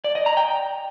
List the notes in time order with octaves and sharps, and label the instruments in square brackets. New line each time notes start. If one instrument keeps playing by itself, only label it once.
[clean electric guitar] D5
D#5
A#5
G5